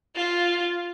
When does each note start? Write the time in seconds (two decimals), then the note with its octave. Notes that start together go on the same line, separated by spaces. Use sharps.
0.16 F4